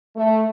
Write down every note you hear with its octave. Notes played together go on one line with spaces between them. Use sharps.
A3